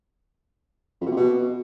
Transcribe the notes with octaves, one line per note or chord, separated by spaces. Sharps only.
F2
B2
C3
B2